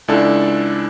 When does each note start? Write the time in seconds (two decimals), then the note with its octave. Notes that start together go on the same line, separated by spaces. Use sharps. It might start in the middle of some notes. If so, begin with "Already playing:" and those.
0.08 C#2 G#3 D4 E4 A4